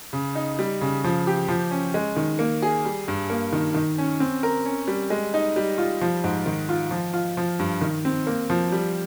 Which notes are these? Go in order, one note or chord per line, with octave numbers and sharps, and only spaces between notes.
C#3
D#4
G3
C#3
F3
G4
F3
C#4
G#3
D#3
A#3
G#4
G3
G2
A#3
D#3
D#3
C#4
C4
A#4
C#4
G3
G#3
D#4
G3
F4
F3
G#2
D#3
F4
F3
F4
F3
G2
D#3
C4
A#3
F3
G3